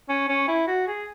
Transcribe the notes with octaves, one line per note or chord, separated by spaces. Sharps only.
C#4
C#4
E4
F#4
G#4